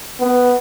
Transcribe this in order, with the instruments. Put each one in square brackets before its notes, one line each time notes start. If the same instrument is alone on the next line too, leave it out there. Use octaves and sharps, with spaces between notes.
[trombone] B3